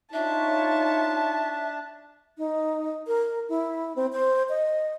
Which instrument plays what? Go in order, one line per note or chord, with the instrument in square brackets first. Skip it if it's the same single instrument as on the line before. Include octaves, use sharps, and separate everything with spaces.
[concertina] D4 [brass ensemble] D#4 F4 C#5 [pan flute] E5 [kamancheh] A5
[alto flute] D#4
A#4
E4
C4
C5
D#5